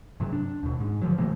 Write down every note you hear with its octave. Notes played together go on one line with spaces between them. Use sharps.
G2 C3 F#3
D4
D#2 B2
G#2
D3 F3 F#3
C3 E3 A3 A#3